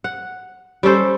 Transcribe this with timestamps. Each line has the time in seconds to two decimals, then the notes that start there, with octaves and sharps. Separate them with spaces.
0.04 F#5
0.83 G3 C#4 A4 C5